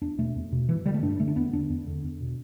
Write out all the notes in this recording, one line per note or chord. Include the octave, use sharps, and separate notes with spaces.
E2 D4
B2 A3
E2
B2
G2 E3
D3 G3
A3
G2 D4
D3 A3
D4
E2 B3
D3 D4
E2
D3
E2
B2